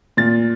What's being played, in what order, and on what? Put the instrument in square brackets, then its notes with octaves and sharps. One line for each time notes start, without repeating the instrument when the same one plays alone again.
[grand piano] A#2 A6